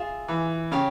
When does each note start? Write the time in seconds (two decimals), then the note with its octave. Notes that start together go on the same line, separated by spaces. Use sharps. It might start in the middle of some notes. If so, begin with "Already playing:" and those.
Already playing: F4 G#4 E5
0.28 E3
0.72 C#3 G4 C#5 F5